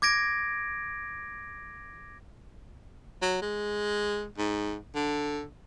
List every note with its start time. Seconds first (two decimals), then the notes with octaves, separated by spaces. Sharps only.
0.02 D6 G#6 A#6 D7
3.22 F#3
3.42 G#3
4.38 G#2
4.95 D3